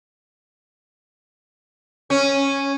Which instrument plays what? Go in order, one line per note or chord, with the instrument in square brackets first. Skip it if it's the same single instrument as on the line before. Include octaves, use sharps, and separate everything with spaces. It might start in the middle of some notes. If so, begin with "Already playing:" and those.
[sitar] C#4